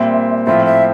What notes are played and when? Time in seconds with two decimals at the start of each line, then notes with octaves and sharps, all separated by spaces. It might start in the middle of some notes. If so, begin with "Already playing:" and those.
Already playing: A#2 G3 C4 E5
0.47 A2 F3 C4 F4 E5
0.66 E5